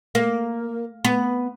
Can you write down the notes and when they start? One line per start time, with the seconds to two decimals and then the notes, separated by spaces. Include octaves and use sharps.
0.15 A#3
1.05 B3